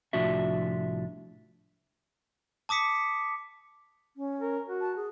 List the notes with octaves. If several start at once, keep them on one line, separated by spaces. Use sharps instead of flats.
C2 A2 F3 D4 F#4 E5
A5 D6 D#6 B6 C#7
C#4
A#4
F#4
A5
G#4